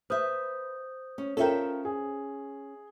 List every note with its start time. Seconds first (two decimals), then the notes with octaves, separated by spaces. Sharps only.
0.10 B4 C5 E5 D#6 G6
1.18 C#4
1.37 C#4 F4 A4 A#4 E5 G5
1.85 G#4